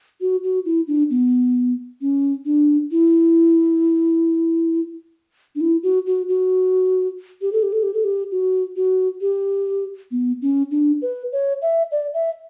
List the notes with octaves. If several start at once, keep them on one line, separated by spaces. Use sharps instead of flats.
F#4
F#4
E4
D4
B3
C#4
D4
E4
D4
E4
F#4
F#4
F#4
G4
A4
G4
A4
G4
A4
G4
F#4
F#4
G4
B3
C#4
D4
B4
C#5
E5
D5
E5